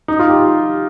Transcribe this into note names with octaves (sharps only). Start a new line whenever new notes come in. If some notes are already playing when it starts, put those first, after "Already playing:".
D#4
F4
G4